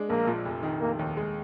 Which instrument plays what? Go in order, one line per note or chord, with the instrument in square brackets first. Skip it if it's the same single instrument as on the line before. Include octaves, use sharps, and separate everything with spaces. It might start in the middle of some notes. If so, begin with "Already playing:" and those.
Already playing: [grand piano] G#3 D4
[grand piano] A#1 [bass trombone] A#3
[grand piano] A#2
F1
D#3
[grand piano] F1 [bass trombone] A#3
[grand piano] D#2
G#3